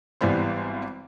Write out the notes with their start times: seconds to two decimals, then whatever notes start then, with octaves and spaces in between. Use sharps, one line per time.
0.21 G#1 E3 G3 B3 C5